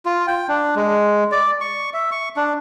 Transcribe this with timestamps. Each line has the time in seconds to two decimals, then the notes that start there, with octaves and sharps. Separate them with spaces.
0.06 F4
0.28 G5
0.49 D4
0.76 G#3
1.32 D5
1.61 C#6
1.94 E5
2.11 C#6
2.37 D4